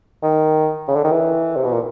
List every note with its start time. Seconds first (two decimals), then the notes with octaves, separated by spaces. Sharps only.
0.23 D#3
0.88 C#3
0.96 D3
1.04 D#3
1.12 E3
1.56 C3
1.65 B2
1.72 A#2